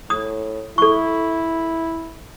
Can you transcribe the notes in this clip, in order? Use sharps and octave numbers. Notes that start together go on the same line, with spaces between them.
A2 D#6
E4 A4 C#6